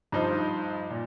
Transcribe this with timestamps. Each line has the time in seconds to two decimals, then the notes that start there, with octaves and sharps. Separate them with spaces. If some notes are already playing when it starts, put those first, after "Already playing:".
0.12 G2 F3 D#4 C5 D#5
0.91 A#2